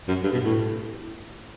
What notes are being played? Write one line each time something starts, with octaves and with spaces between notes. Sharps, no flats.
F#2
G2
B2
A2